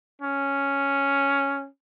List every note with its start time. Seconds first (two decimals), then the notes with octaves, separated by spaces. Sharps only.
0.22 C#4